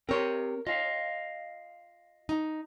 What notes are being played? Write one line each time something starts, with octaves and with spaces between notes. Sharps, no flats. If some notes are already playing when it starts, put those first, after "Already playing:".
C4 G4 A#4 C#5 C6
F4 D#5 F5
D#4